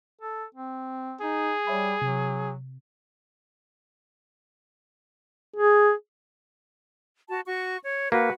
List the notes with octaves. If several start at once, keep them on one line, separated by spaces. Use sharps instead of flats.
A4
C4
D#4 G#4
G3 C#5 E5 B5
C3 F#3
G#4
F#4 A5
F#4 C#6
C#5
A#3 F#4 B4